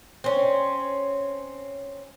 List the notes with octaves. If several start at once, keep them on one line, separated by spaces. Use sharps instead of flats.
C4 C#4